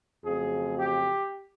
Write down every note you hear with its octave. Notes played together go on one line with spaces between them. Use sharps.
F2 C#3 F#3 A3 G#4
G4